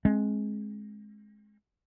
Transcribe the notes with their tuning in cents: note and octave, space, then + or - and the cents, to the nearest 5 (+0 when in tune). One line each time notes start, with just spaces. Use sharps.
G#3 +15 C4 +40